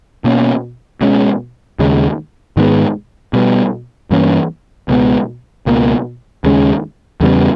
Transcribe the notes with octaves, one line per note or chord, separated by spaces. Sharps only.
B2 A#3 C#4
B2 G#3 C#4
D#2 C#3 G#3
G#2 D#3 G#3 B3
B2 G3 B3
G2 E3 A#3 C#4
C#2 B2 G#3 B3
C#2 B2 A#3
D#2 C#3 G#3 C#4
E2 C#3 G3 B3